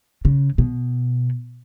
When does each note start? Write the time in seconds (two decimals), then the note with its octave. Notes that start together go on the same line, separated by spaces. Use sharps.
0.25 C#3
0.58 B2